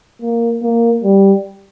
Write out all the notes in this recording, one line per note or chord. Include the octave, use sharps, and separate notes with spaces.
A#3
A#3
G3